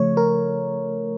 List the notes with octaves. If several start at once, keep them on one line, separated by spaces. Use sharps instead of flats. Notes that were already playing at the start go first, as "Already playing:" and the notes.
Already playing: C#3 F3 A3 C#5
A#4